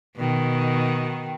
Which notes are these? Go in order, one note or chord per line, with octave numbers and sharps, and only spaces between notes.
B2 D#3